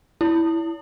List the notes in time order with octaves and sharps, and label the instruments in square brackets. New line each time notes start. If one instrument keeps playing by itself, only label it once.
[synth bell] E4